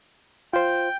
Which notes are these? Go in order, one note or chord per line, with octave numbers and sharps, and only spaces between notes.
F4 C5 G5